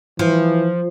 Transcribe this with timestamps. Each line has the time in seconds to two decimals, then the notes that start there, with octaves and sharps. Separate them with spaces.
0.19 E3 F3